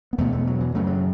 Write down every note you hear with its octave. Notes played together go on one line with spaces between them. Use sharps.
B3
E2 B2 A3
A3
F#3
E3
F#2 C#3 A3
F#3